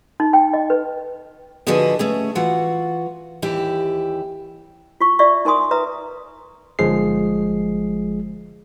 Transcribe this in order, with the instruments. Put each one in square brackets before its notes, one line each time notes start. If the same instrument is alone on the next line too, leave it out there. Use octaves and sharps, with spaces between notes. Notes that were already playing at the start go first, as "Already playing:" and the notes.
[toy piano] D#4
G5
D#5
B4
[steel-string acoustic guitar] D3 F3 F#4 G#4 B4 D#5
A3 C#4 G#4
E3 F4 F#4 F#5
D#2 E3 E4 G4
[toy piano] F4 C#6
F4 D5 E5 C#6
D#4 A#4 G#5 C6 D#6
B4 E5 A#5 D#6
[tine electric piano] G1 F3 G#3 G#4 C7